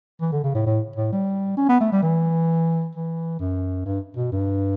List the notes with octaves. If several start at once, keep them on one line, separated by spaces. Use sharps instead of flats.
E3
D3
C#3
A2
A2
A2
G3
C#4
B3
A3
G3
E3
E3
F#2
G2
B2
G2